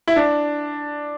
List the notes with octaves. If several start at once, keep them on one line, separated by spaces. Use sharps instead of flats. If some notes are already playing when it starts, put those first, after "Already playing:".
E4
D4